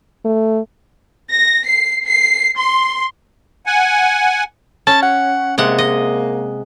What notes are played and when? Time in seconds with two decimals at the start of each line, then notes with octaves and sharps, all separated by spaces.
0.25 A3
1.32 A#6
1.64 C7
2.07 C7
2.56 C6
3.66 F#5 G#5
4.87 C#4 A5
5.02 F#5
5.58 C3 G#3 A#3 F#5
5.78 D#5